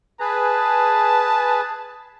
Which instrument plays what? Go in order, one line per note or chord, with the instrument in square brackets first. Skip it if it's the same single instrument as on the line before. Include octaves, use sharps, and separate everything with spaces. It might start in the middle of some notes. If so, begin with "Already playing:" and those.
[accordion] G#4 B4 [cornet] A5